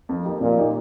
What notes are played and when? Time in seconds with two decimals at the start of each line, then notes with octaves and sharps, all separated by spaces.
0.09 F2
0.25 D#3 A#3 D#4 G4
0.41 F2 A#2
0.57 D#3 A#3 D#4 G4